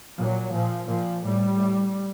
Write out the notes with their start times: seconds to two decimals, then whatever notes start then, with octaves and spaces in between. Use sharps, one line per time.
0.19 A#2 F#3
0.53 A#2 F3
0.88 A#2 F3
1.23 A2 G3
1.57 A2